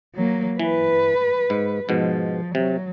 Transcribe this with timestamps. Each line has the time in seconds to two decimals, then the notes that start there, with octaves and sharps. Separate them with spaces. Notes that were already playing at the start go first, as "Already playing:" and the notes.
0.15 F#3 A#3
0.59 E3 B4
1.50 G#2
1.89 G#2 B2 F3
2.55 C3 F#3